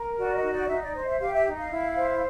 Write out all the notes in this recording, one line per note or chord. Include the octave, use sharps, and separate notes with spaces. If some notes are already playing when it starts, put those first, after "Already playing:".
Already playing: A#4
F#4 D5
D#5
D#4
D5
D#4 E5
D5
C5 D#5
E5
G4 F5
E5
D#4
F5
E4
C5